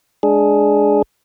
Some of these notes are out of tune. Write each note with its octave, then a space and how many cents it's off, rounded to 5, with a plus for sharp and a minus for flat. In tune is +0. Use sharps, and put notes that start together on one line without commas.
G#3 +10 D4 +0 G#4 +10